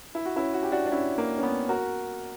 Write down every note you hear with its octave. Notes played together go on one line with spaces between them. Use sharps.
E4
F#4
C#4 E4
F#4
G4
D4 F#4
D4
C#4 E4
A#3
C#4
B3
F#4 A#4